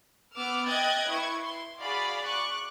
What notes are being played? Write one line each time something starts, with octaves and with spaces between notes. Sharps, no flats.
B3 D6 E6 F6
D#5 E5 G5 F#6 G#6 A6
E4 B4 C#6 G#6
C6
F#4 G#4 D5 F5 B5
C#6 D6 F#6